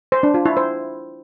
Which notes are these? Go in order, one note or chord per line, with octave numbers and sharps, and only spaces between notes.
C5
D4
F4
E4
C5